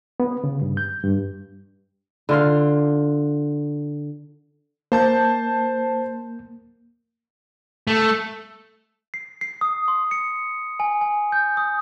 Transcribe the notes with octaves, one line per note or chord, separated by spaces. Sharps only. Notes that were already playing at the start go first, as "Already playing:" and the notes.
B3
C#3
G2
G6
G2
D3 F4 F5
A#3 C5 A5 G6
A3
C7
C7
D#6
C6
C#7
G#5
G#5
G6
D#6